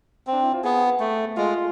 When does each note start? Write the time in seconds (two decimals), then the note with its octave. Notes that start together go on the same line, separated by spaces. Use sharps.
0.27 C4
0.33 D4
0.43 E4
0.54 F4
0.63 B3 G#4
1.00 A3
1.37 G#3 F4